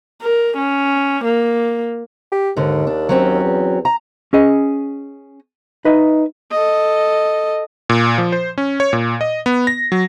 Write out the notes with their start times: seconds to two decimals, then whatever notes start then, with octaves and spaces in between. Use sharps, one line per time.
0.22 A#4
0.57 C#4
1.25 A#3
2.32 G4
2.57 D#2 G#2 D3
2.87 D4
3.09 F#3 C4 C#4
3.44 E2
3.85 A#5
4.33 C#4 G#4 D#5
5.85 D#4 B4 D#5 E5
6.51 A4 D#5
7.89 A#2
8.18 F3
8.32 C5
8.58 C#4
8.80 C#5
8.93 A#2
9.21 D#5
9.46 B3
9.67 A#6
9.92 F#3